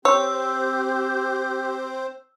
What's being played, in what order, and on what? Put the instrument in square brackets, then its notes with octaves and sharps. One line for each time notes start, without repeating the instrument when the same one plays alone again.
[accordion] C4 C5 [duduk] G4 [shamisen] C#5 [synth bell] E6